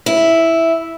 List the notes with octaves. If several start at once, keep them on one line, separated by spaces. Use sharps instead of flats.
E4